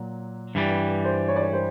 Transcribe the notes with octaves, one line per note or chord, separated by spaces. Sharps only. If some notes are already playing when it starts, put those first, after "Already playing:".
Already playing: A#2 F#3
G2 E3 G3
C5
C#5
D5
C#5
C5